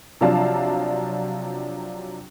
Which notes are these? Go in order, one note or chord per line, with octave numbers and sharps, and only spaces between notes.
C3 F3 F#3 D4 F5 A5